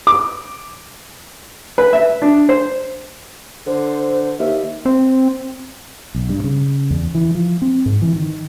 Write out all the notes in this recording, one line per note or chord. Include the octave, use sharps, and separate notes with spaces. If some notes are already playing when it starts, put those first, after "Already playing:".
D6
B4
E5
D4
C5
D3 C5
D#2 E5
C4
B1
G2
C#3
E2
E3
F3
C4
G#2
E3
D#3